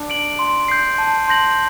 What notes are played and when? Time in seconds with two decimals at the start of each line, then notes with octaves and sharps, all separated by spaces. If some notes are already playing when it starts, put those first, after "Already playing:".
Already playing: D4
0.10 D7 F#7
0.39 C6
0.68 G6 C7
0.98 A5
1.28 C6 G6 A#6 F#7